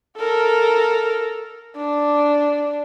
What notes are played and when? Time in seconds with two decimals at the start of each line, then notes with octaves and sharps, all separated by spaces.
0.17 A4 A#4
1.76 D4